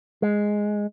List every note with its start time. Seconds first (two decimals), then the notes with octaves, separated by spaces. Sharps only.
0.22 G#3